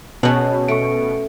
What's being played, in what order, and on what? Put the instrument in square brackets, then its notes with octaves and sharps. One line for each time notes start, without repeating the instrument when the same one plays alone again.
[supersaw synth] B2 [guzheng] C#4 F#5 [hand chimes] G#4 C#5 A5
[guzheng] A3 [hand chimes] C#6 C#7 D7